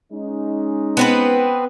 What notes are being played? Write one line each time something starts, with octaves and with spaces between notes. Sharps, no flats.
G#3 C#4 D#4
B3 C4 B4